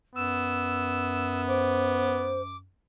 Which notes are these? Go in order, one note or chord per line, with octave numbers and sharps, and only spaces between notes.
F#2 B3 E6
C5 D6